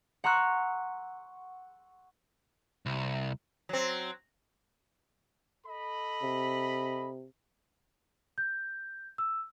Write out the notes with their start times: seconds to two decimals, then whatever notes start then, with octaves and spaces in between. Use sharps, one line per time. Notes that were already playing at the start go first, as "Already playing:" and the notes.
0.24 F#5 A#5 C6 C#6 E6 F#6
2.86 C2
3.69 F#3 C4
5.67 A4 D#5 B5
6.22 C3
8.38 G6
9.18 E6